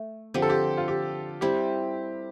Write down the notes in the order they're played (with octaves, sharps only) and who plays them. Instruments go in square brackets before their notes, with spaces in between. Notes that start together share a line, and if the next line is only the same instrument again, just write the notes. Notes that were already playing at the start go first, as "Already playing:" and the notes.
Already playing: [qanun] A3
[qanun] D3 F3 C4 [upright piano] G4
[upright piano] A4
G4
F4
G4
[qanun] G3 C4 E4 [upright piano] G4